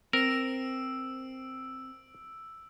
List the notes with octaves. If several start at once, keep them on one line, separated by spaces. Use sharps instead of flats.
C4 A#4 E6 D7